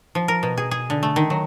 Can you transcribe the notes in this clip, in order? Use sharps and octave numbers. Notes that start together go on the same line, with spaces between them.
F3
A#4
B2
G#4
G#4
D3
A3
D#3
F#3